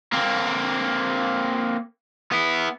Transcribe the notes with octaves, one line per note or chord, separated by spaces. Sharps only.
A#3 C4
B3 E4